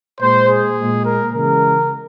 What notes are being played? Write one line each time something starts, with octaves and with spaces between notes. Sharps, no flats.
A#2 G#3 C5
G#4
A#2 G#3
A#4
C#3 E3 G#3 A#4